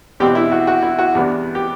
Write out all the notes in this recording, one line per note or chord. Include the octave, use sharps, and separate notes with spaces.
E2 B2 G3 C4 G4
E4
F#4
F#4
E4
F#4
E2 C3 G3 B3 D4
G4